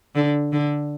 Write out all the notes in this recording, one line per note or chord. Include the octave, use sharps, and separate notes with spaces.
D3
D3